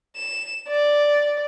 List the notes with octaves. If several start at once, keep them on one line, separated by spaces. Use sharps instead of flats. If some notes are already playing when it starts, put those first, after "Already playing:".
E7
D5